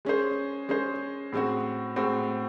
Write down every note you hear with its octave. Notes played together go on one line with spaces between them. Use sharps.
G#3 C#4 G#4 C5
G#3 C#4 G#4 C5
A2 G#3 C4 F#4
A2 G#3 C4 F#4